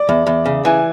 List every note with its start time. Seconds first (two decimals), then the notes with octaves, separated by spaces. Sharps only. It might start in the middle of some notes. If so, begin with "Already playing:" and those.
Already playing: D5
0.09 E2
0.27 E2
0.46 C#3
0.65 E3 G#5